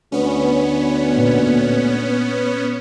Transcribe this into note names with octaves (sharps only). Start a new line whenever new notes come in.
D2 B3 C#4
A#2